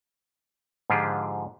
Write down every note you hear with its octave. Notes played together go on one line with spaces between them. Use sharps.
G#2 D3 F3 F4 G4 G#4